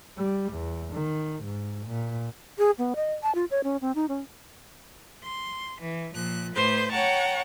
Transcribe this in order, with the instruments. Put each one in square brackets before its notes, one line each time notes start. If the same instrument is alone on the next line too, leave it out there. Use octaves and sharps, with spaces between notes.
[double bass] G3
E2
D#3
G#2
A#2
[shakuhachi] G#4
B3
D#5
A5
F4
C#5
C#4
C4
D#4
C#4
[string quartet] C6
E3
A#2 F3 F#6
A2 B4 C5 C6 G6
C#5 F#5 G5 A5 A#5 C#6